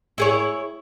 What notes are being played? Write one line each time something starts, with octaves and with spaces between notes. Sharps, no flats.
E4 G#4 C#5